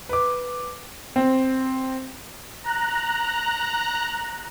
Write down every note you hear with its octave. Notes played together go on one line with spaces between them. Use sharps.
B4 D6
C4
A#5 F#6